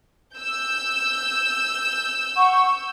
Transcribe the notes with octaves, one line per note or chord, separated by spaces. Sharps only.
E6 G6
F#5 C#6